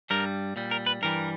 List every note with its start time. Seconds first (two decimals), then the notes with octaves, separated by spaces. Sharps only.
0.10 G2 G3 A#4
0.56 A#2 G3
0.71 A#4
0.86 B4
1.02 G2 E3 G3 A#4